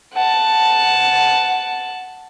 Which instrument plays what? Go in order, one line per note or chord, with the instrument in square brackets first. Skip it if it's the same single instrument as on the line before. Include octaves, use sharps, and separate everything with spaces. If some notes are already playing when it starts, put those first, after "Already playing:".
[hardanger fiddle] F#5 A5